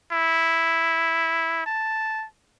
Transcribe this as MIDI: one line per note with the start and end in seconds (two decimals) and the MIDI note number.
0.12 1.66 64
1.66 2.25 81